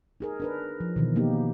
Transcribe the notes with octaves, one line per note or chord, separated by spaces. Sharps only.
D#4 G#4 A#4
D4 A#4 B4
F3
B2 D#3 E3
A#3 B3 D#4 G4